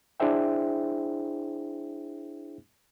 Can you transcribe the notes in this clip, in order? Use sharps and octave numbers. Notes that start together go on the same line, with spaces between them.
D4 E4 G#4 C5 E5 G5